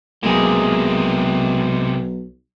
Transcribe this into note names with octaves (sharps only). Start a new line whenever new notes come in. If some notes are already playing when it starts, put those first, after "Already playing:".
B1 C3 G#3 A#3 G#4